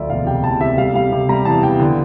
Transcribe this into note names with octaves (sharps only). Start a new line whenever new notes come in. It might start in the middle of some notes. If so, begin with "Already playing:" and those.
Already playing: D2 F3 D5 E5
E1 F5
C3 G5
E1 A5
C3 E5
G3 F5
G3 F5
C3
G3 A#5
E2 A5
E2 G5
D3